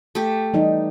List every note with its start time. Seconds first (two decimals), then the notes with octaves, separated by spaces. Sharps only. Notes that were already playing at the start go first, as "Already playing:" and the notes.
0.15 A3 G4
0.54 E3 G3 D#4